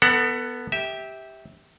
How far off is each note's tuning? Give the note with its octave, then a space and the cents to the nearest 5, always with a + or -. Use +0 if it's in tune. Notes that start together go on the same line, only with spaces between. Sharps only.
B3 +0 A4 +30 F#5 +0
G4 +0 E5 -20